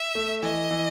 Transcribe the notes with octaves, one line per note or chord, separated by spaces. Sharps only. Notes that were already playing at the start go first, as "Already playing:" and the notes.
Already playing: E5
A3
E3 D#5
E3